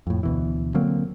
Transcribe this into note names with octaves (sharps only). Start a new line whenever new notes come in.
F2 A2
D2 B2 E3
D3 F#3 A#3 C4